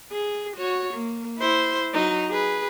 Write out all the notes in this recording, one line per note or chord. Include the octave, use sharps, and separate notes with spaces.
G#4
F#4 C#5
A#3
E4 C5
F#3 D#4
G#4 B4